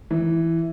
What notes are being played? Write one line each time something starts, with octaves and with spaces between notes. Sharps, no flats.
E3